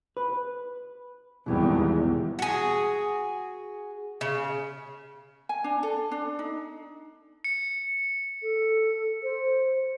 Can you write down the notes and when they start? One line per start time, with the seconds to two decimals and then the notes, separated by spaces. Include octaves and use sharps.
0.17 B4
1.46 G#1 E2 B2 E3 G3
2.39 F#4 G#4
4.21 C#3
5.49 G#5
5.64 D4
5.83 A4
6.12 D4
6.39 D#4
7.44 C#7
8.43 A4
9.23 C5